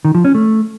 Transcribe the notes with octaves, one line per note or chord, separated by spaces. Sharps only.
D#3
F3
C#4
A3